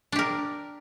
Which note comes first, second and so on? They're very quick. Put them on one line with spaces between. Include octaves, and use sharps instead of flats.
D4 G4 A#4